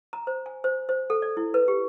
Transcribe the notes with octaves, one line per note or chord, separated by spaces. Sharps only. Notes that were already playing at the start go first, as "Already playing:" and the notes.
A#5
C5
G#5
C5
C5
A4
D5
E4
B4
G4